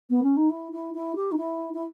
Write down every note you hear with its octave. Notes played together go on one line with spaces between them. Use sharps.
B3
C#4
D#4
E4
E4
E4
G4
D#4
E4
E4